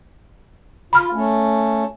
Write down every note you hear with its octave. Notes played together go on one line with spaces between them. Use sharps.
F4 B5 F6
A3 C#4